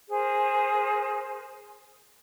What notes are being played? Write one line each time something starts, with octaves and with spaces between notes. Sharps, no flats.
G#4 A#4 C5